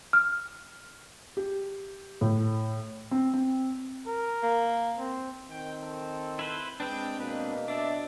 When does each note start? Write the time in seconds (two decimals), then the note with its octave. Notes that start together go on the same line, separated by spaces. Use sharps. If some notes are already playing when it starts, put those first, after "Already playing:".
0.13 F6
1.37 G4
2.21 A2
3.11 C4
3.34 C4
4.07 A#4
4.43 A#3
4.98 C4
5.50 D#3 C4 G5
5.82 A4
6.39 E4 B4 C5
6.80 G#3 C4 D4 B4 G5
7.20 B2 A#3 B4
7.68 D4 D5 E5